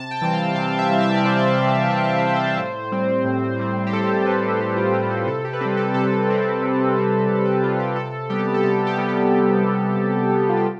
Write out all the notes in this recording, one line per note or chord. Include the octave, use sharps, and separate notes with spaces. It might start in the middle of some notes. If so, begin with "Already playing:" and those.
Already playing: C3 A5
G5
E3 G3 C4 G5
F5
C3 F5
E5
E3 G3 C4
E5
D5
C3 C5
D5
E3 G3 C4
C3 D5
D5
E3 G3 C4
C5
A2
G3 C4
A2
G3 C4
G4
A2 A4
G3 C4 B4
A2 A4
F4
G3 C4 G4
A4
C3 A4
G4
B4
G3 C4 A4
A4
C3 A4
G3 C4
C3
G3 C4
C3
A4
G3 C4 F4
G4
C3 A4
G3 B3 G4
A4
C3 G4
G4
G3 B3
G4
C3
G3 B3
C3
G3 B3
F4
G4